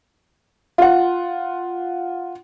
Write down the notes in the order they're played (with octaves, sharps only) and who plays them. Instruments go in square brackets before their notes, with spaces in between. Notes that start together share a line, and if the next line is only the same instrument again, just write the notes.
[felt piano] F4 F#5